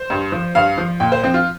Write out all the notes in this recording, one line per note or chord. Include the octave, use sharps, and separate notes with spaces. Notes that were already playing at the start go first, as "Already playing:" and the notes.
Already playing: C5
G2
F3
G2 F5
F3
A#2 G5
C5
F3 C4
F4